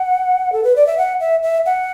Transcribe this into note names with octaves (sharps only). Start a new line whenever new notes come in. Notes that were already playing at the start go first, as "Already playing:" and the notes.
Already playing: F#5
A4
B4
D5
E5
F#5
E5
E5
F#5